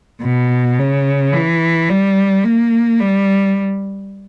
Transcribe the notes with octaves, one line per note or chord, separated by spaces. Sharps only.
B2
C#3
E3
G3
A#3
G3